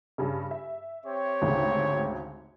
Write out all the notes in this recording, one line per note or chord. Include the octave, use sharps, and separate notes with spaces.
G2 C#3
E5
C4 G4 C#5
G#1 D2 C#3